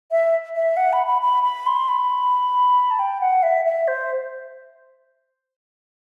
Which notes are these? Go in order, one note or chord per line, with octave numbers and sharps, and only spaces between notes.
E5
E5
F#5
B5
B5
B5
B5
C6
B5
A5
G5
F#5
E5
E5
C5